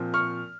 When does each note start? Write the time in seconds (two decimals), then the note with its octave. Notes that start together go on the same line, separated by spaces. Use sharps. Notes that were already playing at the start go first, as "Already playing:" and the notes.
Already playing: A#2 F3 C4
0.14 C#6 F6